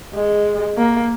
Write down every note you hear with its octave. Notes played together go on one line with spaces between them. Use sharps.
G#3
A#3